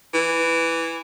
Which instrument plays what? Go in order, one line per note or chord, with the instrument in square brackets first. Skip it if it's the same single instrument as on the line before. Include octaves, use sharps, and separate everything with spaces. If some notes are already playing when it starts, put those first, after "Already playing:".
[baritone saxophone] E3